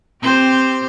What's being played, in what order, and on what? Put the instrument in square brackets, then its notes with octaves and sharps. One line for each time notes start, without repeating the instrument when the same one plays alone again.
[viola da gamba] C4 G4 C5